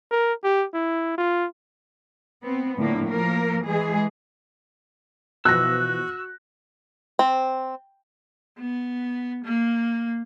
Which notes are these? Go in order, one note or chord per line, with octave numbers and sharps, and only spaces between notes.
A#4
G4
E4
F4
B3 C4
A2 D3 F3 A#3
F3 A#3 A#4
E3 G#3 G#4
B2 E3 F3 F#4 E6 F#6 A#6
C4
B3
A#3